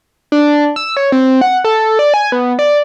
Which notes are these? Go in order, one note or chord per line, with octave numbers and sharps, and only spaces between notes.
D4
E6
C#5
C4
F#5
A4
D5
G#5
B3
D5